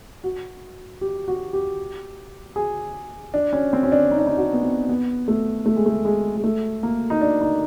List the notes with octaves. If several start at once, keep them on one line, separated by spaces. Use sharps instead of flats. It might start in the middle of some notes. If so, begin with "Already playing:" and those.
F#4
G4
F#4
G4
G#4
D4
C#4
C4
C#4
D4
D#4
D4
D#4
F#4
B3
C4
B3
A3
A3
G#3
A3
G#3
G#3
A3
A#3
D#4
D4
D#4